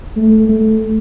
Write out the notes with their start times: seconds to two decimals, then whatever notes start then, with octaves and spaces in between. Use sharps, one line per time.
0.17 A3
0.49 A3